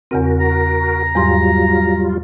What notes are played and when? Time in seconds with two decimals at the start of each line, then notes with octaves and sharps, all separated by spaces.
0.11 E2 C#3 C4 F#4 A#4
0.40 A#5
1.16 E2 G#2 F#3 G3 F4 C6